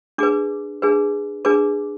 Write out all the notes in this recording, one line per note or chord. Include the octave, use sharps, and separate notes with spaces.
D4 G#4 B4 D6
D4 G#4 B4
D4 G#4 B4 D6